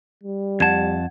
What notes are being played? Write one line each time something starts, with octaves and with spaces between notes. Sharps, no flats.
G3
F2 F#5 A5 G#6